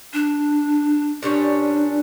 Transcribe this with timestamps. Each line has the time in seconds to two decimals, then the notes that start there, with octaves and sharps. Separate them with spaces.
0.13 D4
1.23 A#2 G3 C#4 D4